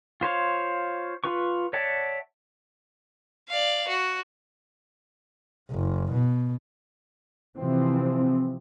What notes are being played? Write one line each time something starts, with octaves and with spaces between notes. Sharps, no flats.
F4 C5 C#5 F5
F4 B4 C#6
C#5 D5 E5 F#5 A5
D5 F5
F#4
F#1
B2
C3 E3 F3 C4